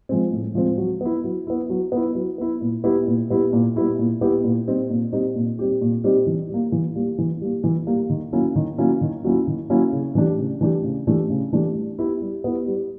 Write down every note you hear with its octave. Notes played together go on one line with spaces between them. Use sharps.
F3 G#3 C4
A2
F3 G#3 C4
F#3
B3 E4
F#3
B3 E4
F#3
B3 E4
F#3
B3 E4
A#2
G3 B3 E4 G4
A#2
G3 B3 E4 G4
A#2
G3 B3 E4 G4
A#2
G3 B3 E4 G4
A#2
G3 C4 D#4 G4
A#2
G3 C4 D#4 G4
A#2
G3 C4 D#4 G4
A#2
G3 C4 D#4 G4
E3
G3 A#3
E3
G3 A#3
E3
G3 A#3
E3
G3 A#3
D#3
F#3 A#3 C#4 E4
D#3
F#3 A#3 C#4 E4
D#3
F#3 A#3 C#4 E4
D#3
F#3 A#3 C#4 E4
C#3
E3 A3 D4 G4
C#3
E3 A3 D4 G4
C#3
E3 A3 D4 G4
C#3
E3 A3 D4 G4
G3
B3 E4 G4
G3
B3 E4 G4
G3